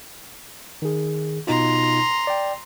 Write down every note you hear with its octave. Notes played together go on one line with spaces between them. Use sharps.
D#3 G#4
B2 D#4 F4 A#5 C6
D5 G5